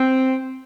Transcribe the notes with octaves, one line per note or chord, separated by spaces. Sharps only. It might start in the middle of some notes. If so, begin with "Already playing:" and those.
Already playing: C4